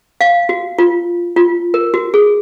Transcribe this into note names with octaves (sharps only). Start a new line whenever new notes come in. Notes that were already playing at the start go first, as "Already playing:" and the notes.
F5
F#4
F4
F4
A#4
F#4
G#4